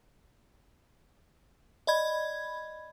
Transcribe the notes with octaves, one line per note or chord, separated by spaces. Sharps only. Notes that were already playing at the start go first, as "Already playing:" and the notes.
D5 D#5 B5 G#6